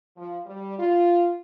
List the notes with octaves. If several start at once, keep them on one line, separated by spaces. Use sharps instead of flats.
F3
G3
F4